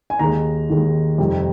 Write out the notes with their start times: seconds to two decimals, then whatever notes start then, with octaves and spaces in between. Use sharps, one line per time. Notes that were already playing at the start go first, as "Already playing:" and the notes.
0.10 G#5
0.19 D#2 D#3 G#3 A#5
0.70 D#2 D#3 G#3
1.18 F2 C3 G3